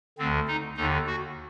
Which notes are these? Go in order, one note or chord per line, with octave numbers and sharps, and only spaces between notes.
D2 D3 C4
D#4
D#2 D3 D#4
F#4